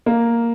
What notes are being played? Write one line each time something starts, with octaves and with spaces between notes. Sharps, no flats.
A#3